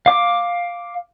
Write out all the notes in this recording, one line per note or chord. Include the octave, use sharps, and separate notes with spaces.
F5 D6